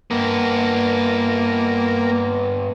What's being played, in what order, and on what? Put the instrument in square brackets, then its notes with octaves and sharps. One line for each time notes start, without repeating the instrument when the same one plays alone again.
[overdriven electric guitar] G2 B3 [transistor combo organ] A#3